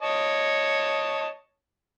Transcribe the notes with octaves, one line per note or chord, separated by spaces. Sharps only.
C#5 D#5 A5